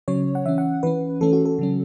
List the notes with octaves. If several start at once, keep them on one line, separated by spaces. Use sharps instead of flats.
C#3 F#3 C#4 C#5
F#5
E3 C#4 E5
F#5
E3 C#4 B4
E3 A3 C#4 A4
F#4
A4
C#3 F#3 C#4